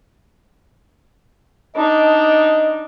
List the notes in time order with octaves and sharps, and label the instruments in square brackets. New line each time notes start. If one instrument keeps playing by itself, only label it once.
[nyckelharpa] D4 D#4 [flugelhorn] D#5